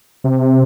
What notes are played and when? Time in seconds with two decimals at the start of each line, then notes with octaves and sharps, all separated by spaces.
0.24 C3